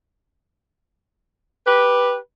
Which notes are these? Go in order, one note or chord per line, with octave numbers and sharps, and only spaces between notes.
G4 B4